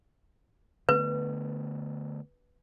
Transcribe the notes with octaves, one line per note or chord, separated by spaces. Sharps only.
D3 A3 B3 B4